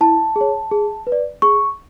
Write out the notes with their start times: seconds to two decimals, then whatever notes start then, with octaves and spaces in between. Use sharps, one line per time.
0.01 E4 A5
0.36 G#4
0.41 C#5
0.71 G#4
1.07 B4
1.12 D5
1.42 G#4 C#6